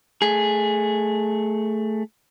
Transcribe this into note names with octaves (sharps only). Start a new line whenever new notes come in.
A3 G#4